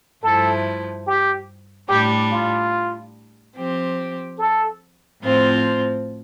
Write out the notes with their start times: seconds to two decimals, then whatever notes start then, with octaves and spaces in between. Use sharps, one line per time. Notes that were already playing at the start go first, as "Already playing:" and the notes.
0.23 G2 F3 A3 E4 A4
1.07 G4
1.89 A2 G3 D4 G4
2.32 F4
3.56 F3 C4 G4
4.39 A4
5.22 A2 F3 C4 F4